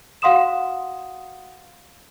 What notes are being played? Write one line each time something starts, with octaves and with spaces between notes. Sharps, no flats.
F#4 F5 F#5 C6 D#6 E7